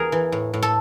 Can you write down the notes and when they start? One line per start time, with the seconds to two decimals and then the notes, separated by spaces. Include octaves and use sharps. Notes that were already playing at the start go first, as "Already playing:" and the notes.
Already playing: E2 G#4 A#4
0.12 E3
0.32 A2
0.54 A2
0.62 A4